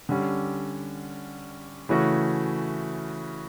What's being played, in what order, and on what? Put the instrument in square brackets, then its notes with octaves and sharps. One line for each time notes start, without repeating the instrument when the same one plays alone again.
[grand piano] D3 G3 C#4
C#3 E3 A3 C#4 F#4